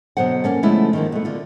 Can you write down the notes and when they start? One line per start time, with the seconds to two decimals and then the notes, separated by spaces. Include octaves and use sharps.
0.17 B2 D3 F#3 C5 F#5
0.44 A#3 C#4 A4
0.63 D3 F3 G#3 A3 C#4 E4
0.93 D#3 F3 A#3
1.12 B2 A3
1.25 D3 F4